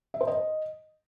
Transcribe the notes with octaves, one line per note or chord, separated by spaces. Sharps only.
E5
C5
D#5